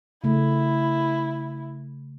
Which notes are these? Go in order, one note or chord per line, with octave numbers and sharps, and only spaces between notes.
C#3 A3 E4